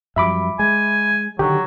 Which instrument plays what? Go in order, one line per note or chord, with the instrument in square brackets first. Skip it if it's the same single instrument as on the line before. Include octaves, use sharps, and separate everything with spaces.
[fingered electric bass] F#2 F3 G3 [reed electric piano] E5 B5 D6
[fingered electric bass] G#3 [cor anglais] G#5
[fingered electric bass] D3 D#3 [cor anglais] F#3 [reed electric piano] G4